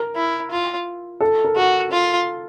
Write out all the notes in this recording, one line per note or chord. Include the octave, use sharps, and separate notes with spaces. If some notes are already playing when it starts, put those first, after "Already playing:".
Already playing: A#4
E4
F4
A4
A#4
F#4 A4
F4